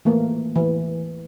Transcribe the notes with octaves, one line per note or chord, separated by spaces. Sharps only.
E3 A3 A#3
E3